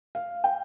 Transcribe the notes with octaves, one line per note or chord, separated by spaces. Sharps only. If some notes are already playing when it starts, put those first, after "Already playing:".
F5
G5